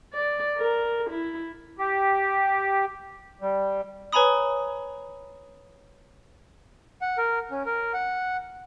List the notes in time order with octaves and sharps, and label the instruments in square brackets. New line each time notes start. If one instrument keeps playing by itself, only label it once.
[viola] D5
A#4
E4
[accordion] G4
G3
[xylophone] B4 C#5 G#5 A#5 B5 D#6
[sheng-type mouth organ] F#5
A#4
C#4
A#4
F#5